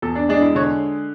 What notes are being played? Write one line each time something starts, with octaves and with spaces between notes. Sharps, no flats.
E2 A4
D4
G#3 D4
E4
D3 C#5